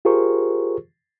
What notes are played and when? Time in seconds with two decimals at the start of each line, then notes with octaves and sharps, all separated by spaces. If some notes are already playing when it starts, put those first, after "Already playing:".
0.05 F4 G4 G#4 A#4 C5 C#6